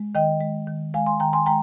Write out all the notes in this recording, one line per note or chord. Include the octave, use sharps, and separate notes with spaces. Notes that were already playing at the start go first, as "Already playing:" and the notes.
Already playing: G#3
D#3 D#5 G5
G#3
D#3
G#3 F5 G#5
G#5 C6
D#3 G5 A#5
G#5 C6
G#3 G5 A#5